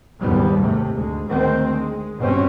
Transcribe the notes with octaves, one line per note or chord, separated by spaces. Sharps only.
F#1 D#2 G#2 G3 B3
G#2 C3 A3
D2 G#3
D2 D#3 G#3 C4
G#3
G1 B2 C4 C#4